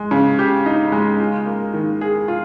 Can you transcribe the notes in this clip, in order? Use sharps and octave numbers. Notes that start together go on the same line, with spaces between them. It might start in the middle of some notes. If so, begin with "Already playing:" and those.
Already playing: G#3
C#3
G4
D#4
G#3
F4
A#3
D#3
G#4
F4